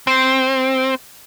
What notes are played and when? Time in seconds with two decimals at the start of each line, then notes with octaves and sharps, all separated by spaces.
0.07 C4